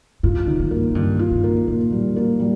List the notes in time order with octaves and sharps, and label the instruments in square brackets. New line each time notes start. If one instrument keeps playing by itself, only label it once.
[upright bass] G#2 [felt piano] F4
[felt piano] D#3
[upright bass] G2
[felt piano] A#3
[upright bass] G#2
[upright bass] G2 [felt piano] D#3
[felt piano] F4
[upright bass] G2
[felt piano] A#3
[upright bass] A#2 [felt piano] A#3
[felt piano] G3
A#3
G3